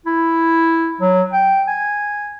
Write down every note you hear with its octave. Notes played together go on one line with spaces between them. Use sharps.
E4
F#3
G5
G#5